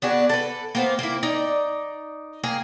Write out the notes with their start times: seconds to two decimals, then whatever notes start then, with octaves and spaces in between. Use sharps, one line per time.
0.02 B3 D4 F#4 G#4
0.29 A4 B4
0.75 A#3 B3 C5
0.99 A#3 E4
1.23 D#4 D5
2.43 A#3 G#4